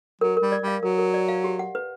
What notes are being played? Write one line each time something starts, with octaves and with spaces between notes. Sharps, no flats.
F#3 A#4
G3 A#4
D5
G3
F5
F#3 A#4
A#4
D5
F5
G4
F#5
B4